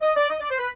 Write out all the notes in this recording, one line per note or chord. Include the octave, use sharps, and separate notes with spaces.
D#5
D5
D#5
D5
C5
B4